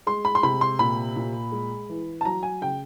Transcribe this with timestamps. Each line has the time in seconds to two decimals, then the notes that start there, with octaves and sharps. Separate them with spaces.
0.07 G#3 C6
0.25 B5
0.35 C6
0.43 C3 B5
0.61 C6
0.79 A#2 B5
1.16 A#2
1.52 G#3
1.89 E3
2.21 A5
2.25 F#3 A#5
2.43 G#5
2.62 C#3 G5